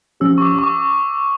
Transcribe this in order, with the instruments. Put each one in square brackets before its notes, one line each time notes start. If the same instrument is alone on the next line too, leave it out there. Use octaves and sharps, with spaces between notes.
[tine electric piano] F3 C#4 G4 [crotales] E6
[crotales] C#6
D6
C#6
D6